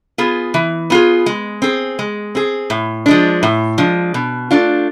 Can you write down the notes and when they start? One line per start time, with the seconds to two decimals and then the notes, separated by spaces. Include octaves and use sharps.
0.18 B3 F4 G#4
0.54 E3
0.90 B3 F4 G#4
1.26 G#3
1.62 C4 G#4
1.99 G#3
2.35 C4 G#4
2.70 A2
3.06 F3 G#3 D4
3.43 A2
3.78 F3 G#3 D4
4.14 B2
4.51 A3 D4 F4